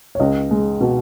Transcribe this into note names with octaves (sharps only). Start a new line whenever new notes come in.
C#5
C#2 D#5
G#3
B2